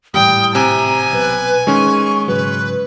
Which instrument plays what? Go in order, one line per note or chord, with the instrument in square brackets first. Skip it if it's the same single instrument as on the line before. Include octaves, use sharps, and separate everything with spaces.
[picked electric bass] G#1 A2 E3 [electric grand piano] G3 [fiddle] G5 [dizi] D#6
[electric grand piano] C3 [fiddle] G#5 [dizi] A#5
[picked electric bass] B1 [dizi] B4
[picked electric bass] D#3 [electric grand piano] G#3 C#4 [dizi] C#6
[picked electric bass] G#2 C#3 F#3 [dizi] B4